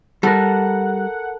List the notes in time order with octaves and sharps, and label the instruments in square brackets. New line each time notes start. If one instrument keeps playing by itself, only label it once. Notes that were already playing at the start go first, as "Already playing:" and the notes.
[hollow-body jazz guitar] G3 [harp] A4 A#4 [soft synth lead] F#5